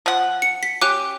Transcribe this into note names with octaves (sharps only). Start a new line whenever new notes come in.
F3 F#5
C#7
B6
C#4 G4 D6 F#6